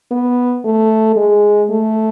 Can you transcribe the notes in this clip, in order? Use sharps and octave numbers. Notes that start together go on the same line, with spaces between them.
B3
A3
G#3
A3